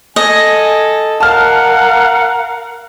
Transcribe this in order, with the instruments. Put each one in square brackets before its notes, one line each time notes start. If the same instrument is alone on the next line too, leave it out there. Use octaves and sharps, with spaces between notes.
[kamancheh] A4 [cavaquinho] D#5 [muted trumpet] G#5
[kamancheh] A#4 F5 [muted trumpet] F#5 [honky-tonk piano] A5 F6